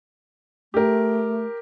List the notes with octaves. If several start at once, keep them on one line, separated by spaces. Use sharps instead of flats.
A3 G4 A#4